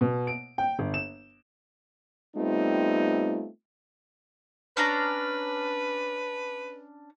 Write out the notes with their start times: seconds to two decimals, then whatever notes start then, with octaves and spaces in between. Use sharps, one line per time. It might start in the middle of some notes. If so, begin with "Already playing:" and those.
0.01 B2
0.27 D7
0.58 G5
0.79 G1
0.94 E7
2.36 G3 A3 B3 C4 D#4 F4
4.77 C#4 D4 B4 A#5